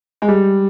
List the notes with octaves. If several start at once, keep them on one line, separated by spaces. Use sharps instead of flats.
G#3
G3